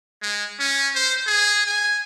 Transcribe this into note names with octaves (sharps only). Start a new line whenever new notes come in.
G#3
C#4
C5
G#4
G#5